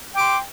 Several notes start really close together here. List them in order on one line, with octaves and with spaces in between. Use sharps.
G5 D6 C6